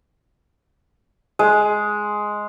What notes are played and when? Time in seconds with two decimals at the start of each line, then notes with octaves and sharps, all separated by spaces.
1.39 G#3